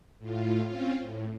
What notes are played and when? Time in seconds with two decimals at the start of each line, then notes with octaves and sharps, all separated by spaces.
0.18 A2 F4
0.66 C4 C#4 F4
1.00 A2